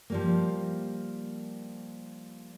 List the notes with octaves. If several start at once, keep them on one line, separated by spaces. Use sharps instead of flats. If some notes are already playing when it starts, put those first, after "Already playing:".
F3 G3 A#3